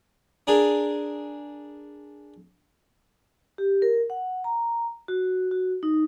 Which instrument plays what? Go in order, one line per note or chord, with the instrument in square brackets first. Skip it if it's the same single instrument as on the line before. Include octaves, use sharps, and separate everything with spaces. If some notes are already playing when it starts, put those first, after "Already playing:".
[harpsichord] D4 G#4 A#4
[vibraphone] G4
A#4
F#5
A#5
F#4
F#4
D#4